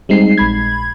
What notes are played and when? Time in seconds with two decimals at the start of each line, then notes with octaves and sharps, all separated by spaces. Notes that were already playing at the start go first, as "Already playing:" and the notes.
0.09 G3 G#3 C4 D#4 C7
0.38 A#1 B5 G#6